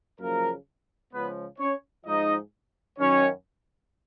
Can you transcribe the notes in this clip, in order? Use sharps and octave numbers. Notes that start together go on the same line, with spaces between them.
F#2 C#3 F3 A#3 A#4
C#2 C#3 F3 B3 B4
C#4 C#5
G#2 F3 D#4 D#5
F#2 D#3 C#4 C#5